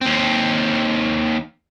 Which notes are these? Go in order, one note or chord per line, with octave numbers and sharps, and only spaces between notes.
D#2 C4